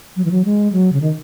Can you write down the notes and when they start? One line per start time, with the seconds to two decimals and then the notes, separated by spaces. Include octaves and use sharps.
0.16 F#3
0.25 E3
0.31 F#3
0.45 G#3
0.72 F#3
0.93 C#3
1.01 D#3